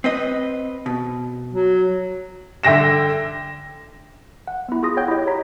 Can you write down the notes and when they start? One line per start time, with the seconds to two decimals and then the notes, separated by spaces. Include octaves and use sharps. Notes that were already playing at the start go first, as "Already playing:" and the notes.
0.04 C4 B4 D#5
0.86 B2
1.53 F#3
2.63 D3 E5 G5 A#6 E7
4.48 F#5
4.68 B3 E4
4.83 F4 G#4 D#6 A#6
4.97 C#5 F#5 G5 G6
5.08 E4 G4 D#5
5.27 C#5 A#5 B6